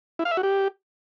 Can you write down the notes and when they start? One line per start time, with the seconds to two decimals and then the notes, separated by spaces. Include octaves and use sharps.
0.19 E4
0.25 F5
0.31 E5
0.37 F#4
0.43 G4